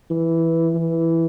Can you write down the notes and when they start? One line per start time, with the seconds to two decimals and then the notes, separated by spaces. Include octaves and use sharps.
0.11 E3
0.75 E3